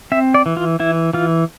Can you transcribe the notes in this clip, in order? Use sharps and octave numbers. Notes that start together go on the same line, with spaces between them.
C4 E5
D5
E3
F4
E3 E4
E3 F4